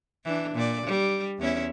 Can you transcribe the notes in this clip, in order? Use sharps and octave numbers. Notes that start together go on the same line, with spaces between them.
E3 D4
A#2 D5
G3
E2 C#4 E4